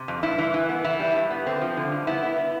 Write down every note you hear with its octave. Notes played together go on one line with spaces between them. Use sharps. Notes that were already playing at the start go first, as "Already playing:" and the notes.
Already playing: C3
F2
G2 E4
E3
E3
B3
E3 E4
G3
G2
B3
D3 C4
F3
D3
G2
B3 E4
B3
B3